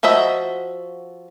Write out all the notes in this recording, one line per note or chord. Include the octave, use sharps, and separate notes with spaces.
F3 F#4 D#5 E5 A#5